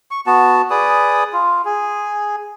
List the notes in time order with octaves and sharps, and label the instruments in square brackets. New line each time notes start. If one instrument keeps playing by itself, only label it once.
[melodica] C#6
B3 F#4 A5
G#4 B4 D5 D#6
F4
G#4